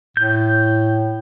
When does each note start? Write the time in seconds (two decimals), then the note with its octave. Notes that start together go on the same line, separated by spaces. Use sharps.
0.17 A2 G6